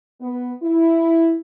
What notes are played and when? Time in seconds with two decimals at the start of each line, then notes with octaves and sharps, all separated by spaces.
0.21 B3
0.62 E4